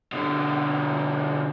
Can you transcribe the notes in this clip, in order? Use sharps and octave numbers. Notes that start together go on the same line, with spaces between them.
B2 D3